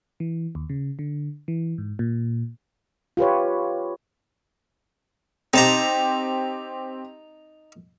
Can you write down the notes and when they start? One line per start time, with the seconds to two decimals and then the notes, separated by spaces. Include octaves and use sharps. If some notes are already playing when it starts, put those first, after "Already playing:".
0.20 E3
0.55 D#2
0.70 C#3
0.99 D3
1.48 E3
1.78 G#2
1.99 A#2
3.17 F4 G4 B4 C#5
5.54 C4 D#4 G4 A5 A#5